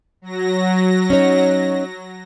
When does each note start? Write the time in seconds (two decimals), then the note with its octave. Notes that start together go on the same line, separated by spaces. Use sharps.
0.22 F#3 A#6
1.10 C#4 D#4 C#5